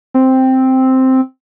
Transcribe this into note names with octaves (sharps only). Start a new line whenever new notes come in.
C4